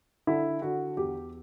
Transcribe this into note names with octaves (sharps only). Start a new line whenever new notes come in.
D3 E4
D3 F#4
E2 G4